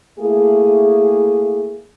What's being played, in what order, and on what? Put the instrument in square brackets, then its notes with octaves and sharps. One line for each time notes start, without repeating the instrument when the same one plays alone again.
[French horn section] A3 A#3 E4 G#4